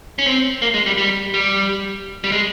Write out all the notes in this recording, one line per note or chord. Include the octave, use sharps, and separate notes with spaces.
C#4
C4
A#3
G#3
G3
G3
G3
G3
G#3